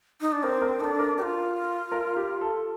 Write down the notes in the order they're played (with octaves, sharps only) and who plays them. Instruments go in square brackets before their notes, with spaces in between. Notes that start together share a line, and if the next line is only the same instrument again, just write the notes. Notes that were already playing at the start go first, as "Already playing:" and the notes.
[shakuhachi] D#4
D4
[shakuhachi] C4 [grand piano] A#4
[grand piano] A#4
[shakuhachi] D4 D#4 [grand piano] A4
[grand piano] A#4
[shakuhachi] G4 [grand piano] A#4
[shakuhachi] F4
[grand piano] A#4
G4
A4